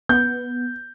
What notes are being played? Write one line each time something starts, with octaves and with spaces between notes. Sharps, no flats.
B3 G6